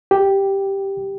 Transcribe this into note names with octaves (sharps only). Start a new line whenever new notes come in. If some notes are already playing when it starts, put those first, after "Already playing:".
G4